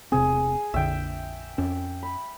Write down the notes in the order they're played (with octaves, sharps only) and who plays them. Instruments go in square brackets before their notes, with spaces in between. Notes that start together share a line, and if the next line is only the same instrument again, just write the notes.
[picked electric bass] E1 C3 C4 [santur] G#4
[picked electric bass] A#1 F2 D3 [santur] E5 G5
[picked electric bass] F2 C#4
[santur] B5